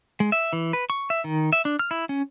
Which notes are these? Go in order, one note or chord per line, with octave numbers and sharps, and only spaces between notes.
G#3
E5
E3
B4
C#6
E5
D#3
E5
D4
F6
E4
C#4